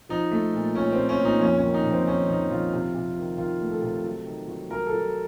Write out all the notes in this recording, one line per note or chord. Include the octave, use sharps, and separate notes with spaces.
F3 D#4
A3
A#2
A#2 C#4
A#2 C4
C#4
A#2
D#4
F2 C#4
C#4
D#3
D#4
F2
C4
D#3 C#4
F2 D#4
F2 F4
C3
C3
D#3
D#3 F4
A3
A4
C3
F#3
D#3
F#3
F#3 A#4
A4
F#3